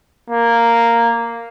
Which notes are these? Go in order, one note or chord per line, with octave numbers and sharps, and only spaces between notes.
A#3